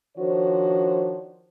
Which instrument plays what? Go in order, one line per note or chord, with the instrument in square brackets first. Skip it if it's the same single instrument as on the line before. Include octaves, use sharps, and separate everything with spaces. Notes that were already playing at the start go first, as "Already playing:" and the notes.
[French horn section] D#3 F3 D4 F#4 C5 C#5